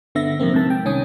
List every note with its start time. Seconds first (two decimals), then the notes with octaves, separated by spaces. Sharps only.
0.15 G1 D3 B3 E5 A#6
0.40 F2 C3 A#3 C4
0.54 G#2 C3 A5
0.70 G5
0.85 C2 D#3 C#4 G#5 D#6